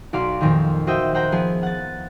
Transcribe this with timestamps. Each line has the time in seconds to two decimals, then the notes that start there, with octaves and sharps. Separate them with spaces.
0.13 B1 F#4 D5 F5 C6
0.41 F2 A#2 D#3
0.87 F#4 C5 D#5 E5 G5
1.14 C5 F#5 G5 A#5
1.32 F3 B3 G#4
1.63 F#5 A6